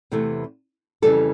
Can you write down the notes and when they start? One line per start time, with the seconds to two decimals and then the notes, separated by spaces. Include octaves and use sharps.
0.12 E2 C3 E3 A3
1.02 F2 C#3 E3 G3 A4